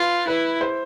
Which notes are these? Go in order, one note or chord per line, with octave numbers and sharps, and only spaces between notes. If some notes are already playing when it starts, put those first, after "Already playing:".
Already playing: F4 B4
E4 B4
C5